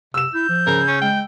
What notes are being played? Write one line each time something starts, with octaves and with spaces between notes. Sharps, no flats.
C3 E6 E7
E4 G6
F3
C#3 A#4
C#4
G#3 G5